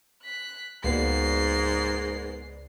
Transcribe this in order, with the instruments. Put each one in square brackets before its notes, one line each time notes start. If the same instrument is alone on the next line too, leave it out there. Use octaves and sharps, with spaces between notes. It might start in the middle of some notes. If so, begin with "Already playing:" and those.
[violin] F#6 B6
[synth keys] C#2 B4 D5 [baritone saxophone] G#2 [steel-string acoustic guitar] A#3 B3 F#4 [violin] C7